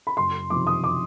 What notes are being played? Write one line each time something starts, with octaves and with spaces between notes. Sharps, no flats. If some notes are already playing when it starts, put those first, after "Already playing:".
B5
F#1 C6
F2 C3 D#3 D6
D#6
D6